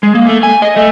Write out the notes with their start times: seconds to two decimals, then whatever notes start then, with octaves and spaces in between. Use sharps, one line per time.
0.03 G#3
0.15 A#3
0.27 A3
0.43 G#5
0.62 D#5
0.76 A3